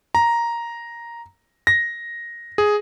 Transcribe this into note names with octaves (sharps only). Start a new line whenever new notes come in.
A#5
A#6
G#4